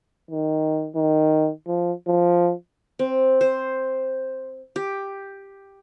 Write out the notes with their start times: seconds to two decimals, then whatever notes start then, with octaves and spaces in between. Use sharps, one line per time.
0.31 D#3
0.95 D#3
1.67 F3
2.07 F3
2.99 C4
3.41 C5
4.76 G4